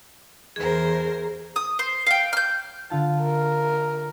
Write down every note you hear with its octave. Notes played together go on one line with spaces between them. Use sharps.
E2 G#4 A#4 C5
D#6
C5
F5 G5
F6 G6
D3 F4 A5
A#4